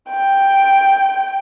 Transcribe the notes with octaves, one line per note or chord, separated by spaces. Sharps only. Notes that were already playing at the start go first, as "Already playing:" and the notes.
G5